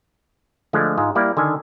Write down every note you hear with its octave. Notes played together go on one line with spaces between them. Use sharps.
D3 F3 G#3 A3
G#2 G#3 F4
G3 A#3 E4 D5
D3 D#3 A4 G#5